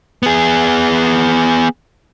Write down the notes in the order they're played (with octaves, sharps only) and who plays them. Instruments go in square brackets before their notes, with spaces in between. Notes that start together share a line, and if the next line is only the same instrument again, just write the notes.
[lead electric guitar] B3 G#4